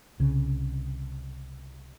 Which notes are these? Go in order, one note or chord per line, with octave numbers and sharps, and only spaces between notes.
C2 C#3